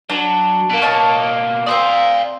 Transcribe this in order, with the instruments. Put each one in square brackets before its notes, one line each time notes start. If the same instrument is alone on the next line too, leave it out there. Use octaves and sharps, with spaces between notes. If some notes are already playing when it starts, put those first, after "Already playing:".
[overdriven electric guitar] F#3 [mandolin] D4
[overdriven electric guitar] B2 A#3
[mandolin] C#5 D#5 A5
[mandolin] C4 C5 D#6 [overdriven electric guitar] D5 F5